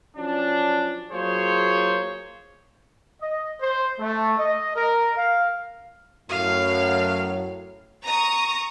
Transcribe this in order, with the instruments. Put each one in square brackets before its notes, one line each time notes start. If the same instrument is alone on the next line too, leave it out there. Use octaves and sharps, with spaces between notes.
[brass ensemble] F3 F#3 C#4 D4
F#3 A#3 F4 G#4 C5 C#5
[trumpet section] D#5
C5
A3
D#5
A#4
F5
[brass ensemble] F#2 A2 F#3 [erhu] F5
[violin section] A#5 C#6 D#6